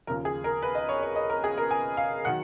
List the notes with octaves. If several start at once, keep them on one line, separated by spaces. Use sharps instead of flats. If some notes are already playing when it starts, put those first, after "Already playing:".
D#2 C#3 F3 A#4
G#4
A#4
B4
D#5
C#5
C#5
D#5
A#4
G#4
A#4
G#5
F5
D#3 F#3 F#5